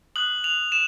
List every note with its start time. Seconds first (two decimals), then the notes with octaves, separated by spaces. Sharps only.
0.16 D#6 F#6 F#7
0.44 F7
0.72 E7